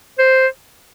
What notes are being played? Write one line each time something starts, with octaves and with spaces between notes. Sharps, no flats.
C5